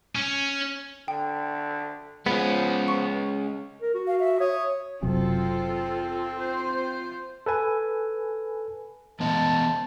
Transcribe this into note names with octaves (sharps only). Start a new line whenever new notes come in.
C#4
D3 G5
F3 G#3 B3 C#4
C#6
A#4
F#4
F5
E5
C#5 D#6
F#1 C3 F#3 C4 F4 A4
F4 C5
A4 B4 G#5
E3 B3 D#5 A5